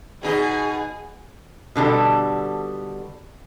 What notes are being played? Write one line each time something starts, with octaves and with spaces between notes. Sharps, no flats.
B2 D#4 G#4 D#5
B2 D3 G3 A4